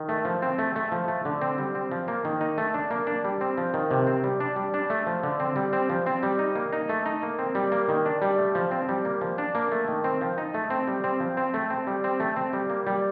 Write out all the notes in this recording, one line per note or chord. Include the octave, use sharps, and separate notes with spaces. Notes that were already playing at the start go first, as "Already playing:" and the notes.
Already playing: D#3
A3
F3
C4
A3
A3
F3
A3
D3
C4
G3
C4
F3
A#3
D#3
D#4
A3
D4
A#3
D4
G3
C4
F3
D#3
C3
C4
G3
D4
G3
D4
A3
F3
D3
C4
G3
C4
F3
C4
G3
D#4
A#3
D#4
A3
D#4
A#3
C4
G3
A#3
D#3
D4
G3
A3
F3
C4
G3
A#3
F3
D4
A#3
A3
D#3
C4
F3
D#4
A3
C4
G3
C4
F3
C4
A3
C4
G3
C4
A3
C4
G3
A#3
G3